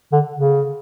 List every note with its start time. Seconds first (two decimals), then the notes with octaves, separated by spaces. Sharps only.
0.12 D3
0.35 C#3